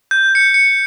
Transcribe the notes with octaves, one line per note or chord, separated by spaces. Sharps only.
G6
C#7
C#7